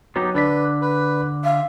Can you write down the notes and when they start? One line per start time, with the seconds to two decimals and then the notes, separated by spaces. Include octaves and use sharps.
0.16 F#3 B3 D#4 G4
0.35 D3 D4 B4 D5 B6
0.81 B4
1.44 E5 F5